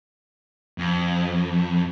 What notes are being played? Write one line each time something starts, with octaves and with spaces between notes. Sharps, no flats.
F2